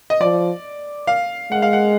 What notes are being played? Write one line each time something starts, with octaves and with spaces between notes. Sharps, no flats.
D#5
F3 D5
F5
G#3 F#5
F5
F#5